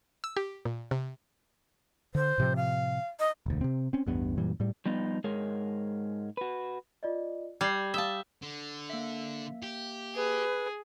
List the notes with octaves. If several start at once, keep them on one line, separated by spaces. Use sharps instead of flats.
E6
G4
A#2
C3
D3 C5
A2 C3 F3
F5
D#5
E1 D2
C3 C4
C4 C#4
A1 E2 G2 B3
F#2 A#2 E3 G3
A2 G3
F3 G3 B3 D#4
G#2 G#3 G#4 A#4 C#5
F#4 B4
F4 D5 D#5
G3 G#6 C7
E5 F5 A5 D#6 G7
D3
A#3 E5
G4
G#4 B4